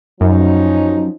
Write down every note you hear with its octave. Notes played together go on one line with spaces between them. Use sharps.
F#2 F3 C#4 D#4